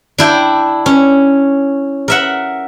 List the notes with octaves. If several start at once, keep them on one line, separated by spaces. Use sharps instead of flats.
D4 E4 G5
C#4
A#4 E5 F#5